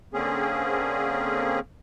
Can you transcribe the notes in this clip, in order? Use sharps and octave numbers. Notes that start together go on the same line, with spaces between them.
D3 A#3 C4 C#4 G#4